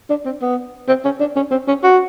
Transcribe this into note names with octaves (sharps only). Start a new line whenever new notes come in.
D4
C4
B3
C4
C#4
D4
C#4
C4
C#4
F#4